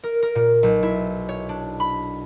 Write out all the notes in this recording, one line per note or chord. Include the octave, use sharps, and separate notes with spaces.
A#4
A#4
A#2
B1
E4
C#5
D4
B5